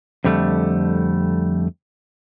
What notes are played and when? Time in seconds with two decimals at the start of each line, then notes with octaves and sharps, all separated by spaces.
0.24 F2 D3 G3 A3